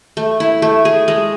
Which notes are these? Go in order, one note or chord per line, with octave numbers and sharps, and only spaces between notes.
A3
E4
A3
G#4
G#3